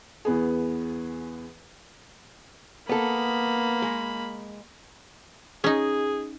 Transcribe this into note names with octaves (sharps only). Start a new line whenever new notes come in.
E2 B3 G#4
A#3 B3 A4 B5
G#3
C#4 D#4 G#4